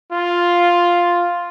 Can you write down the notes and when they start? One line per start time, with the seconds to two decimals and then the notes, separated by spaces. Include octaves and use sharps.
0.12 F4